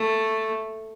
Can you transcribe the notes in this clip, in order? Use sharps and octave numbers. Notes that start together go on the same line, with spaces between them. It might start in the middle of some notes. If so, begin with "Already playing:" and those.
Already playing: A3